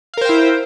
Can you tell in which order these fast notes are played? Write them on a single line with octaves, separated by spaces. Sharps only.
F5 A#4 C5 G5 E4